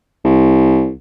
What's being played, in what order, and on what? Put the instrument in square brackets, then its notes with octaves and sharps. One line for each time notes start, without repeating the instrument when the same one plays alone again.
[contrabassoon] C2